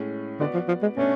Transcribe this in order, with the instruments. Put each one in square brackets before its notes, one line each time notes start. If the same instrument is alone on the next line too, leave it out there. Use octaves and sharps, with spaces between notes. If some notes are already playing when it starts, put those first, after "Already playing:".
Already playing: [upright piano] A2 G#3 C#4
[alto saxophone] D3 [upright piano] B3 F#4 B4 D5
[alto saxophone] F3
F3
G#3
[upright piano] B2 A3 D4 [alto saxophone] C#4